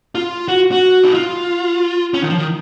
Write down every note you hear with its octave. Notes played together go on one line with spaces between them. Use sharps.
F4
F#4
F#4
D#4
F4
C#4
D#3
F3
D#3